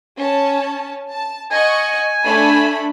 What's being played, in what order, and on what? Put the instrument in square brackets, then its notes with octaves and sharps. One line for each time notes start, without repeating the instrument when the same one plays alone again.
[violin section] C#4 A5
A5
[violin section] D#5 F#5 C#6 [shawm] G#5
[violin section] A3 D4 B5